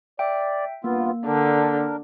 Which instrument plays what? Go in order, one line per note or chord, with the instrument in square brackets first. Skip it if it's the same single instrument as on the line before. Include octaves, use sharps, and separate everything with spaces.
[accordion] D5 [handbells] E5 G5
[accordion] G2 B3 F4 [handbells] A#3
[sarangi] D3 [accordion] D4 A#4